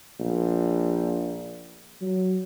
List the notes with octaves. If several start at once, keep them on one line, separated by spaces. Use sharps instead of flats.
A#1
F#3